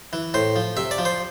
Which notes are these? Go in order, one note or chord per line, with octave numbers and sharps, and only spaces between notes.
E3
A2 C5
F3
C3 E5
D5
F3
C5